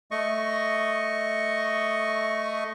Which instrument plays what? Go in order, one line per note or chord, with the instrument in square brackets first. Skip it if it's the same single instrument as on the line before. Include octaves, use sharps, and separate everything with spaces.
[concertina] A3 D#5 C#6